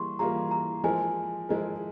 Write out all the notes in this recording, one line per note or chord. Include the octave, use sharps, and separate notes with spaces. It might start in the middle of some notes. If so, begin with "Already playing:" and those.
Already playing: E3 G3 A#3 G#4 C6 C#6
E3 G3 A#3 F4 G#4 A#5
A#5
F3 G#3 E4 A#4 G#5
F3 G#3 E4 A#4